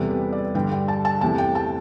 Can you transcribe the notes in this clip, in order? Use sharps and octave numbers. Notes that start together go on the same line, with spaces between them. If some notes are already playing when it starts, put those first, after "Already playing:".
Already playing: E2 C3 G3 B3 A4
B4
D5
G2 D3 G3 G5
G5
A5
A5
E2 C3 E3 A3 A5
G5
A5